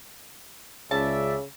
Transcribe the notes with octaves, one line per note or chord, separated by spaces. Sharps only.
C#2 C#3 D5 E5 A5